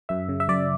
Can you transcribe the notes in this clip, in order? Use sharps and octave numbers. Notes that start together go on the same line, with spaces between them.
F#2 E5
C#3
E5
F#2 D5